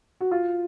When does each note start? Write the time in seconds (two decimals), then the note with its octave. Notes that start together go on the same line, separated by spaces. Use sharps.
0.21 F#4
0.31 F4